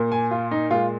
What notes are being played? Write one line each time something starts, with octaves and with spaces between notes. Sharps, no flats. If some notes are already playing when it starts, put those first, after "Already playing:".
Already playing: A#2 A#3
G#5
F4
D#4
A#2 G#3 F4